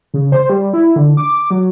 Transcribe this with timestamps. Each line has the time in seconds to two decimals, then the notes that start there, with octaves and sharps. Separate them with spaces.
0.14 C#3
0.32 C5
0.49 G3
0.73 E4
0.96 D3
1.17 D6
1.51 F#3